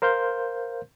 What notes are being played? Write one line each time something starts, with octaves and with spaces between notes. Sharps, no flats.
A#4 C5 F5 C6 G6